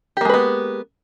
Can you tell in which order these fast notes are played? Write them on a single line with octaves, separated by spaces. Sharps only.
G4 A#3 G#3 B4 B3